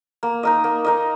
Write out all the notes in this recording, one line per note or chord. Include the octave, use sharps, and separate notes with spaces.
A#3
D#4 A#4 D#5
A#3
D#4 A#4 D#5